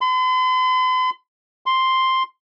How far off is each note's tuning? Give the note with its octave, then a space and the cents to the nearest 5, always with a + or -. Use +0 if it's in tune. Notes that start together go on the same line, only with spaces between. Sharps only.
C6 -45
C6 +0